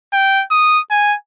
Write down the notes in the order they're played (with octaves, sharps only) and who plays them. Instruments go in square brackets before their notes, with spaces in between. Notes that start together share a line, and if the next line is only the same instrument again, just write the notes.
[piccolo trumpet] G5
D#6
G#5